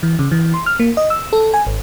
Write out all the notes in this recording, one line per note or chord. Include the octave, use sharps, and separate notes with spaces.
E3
C#3
E3
C6
F6
A#3
D#5
E6
A4
G#5
G#1